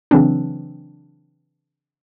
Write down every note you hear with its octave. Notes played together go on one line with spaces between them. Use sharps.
C#3 E3 F#3 C4 D4